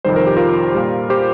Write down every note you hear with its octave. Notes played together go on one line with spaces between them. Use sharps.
F2 C3 D#3 G3 C5
A#4
G4
F4 A#4
A#2 G3
G4 C5